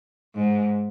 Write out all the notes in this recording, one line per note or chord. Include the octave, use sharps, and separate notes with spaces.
G#2